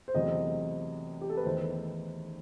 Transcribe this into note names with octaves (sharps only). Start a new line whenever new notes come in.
C5
E2 C3 F#3 A3 D#5
G4
A4
B4
E2 D#3 A3 C5